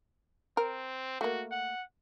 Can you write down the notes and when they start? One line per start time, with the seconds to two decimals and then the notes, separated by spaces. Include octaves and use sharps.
0.57 C4 A#4
1.21 A3 A#3 F#4
1.52 F#5